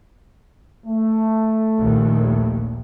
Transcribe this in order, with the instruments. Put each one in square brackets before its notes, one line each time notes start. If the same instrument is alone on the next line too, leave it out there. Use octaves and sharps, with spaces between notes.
[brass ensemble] A3
[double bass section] A#1 D#2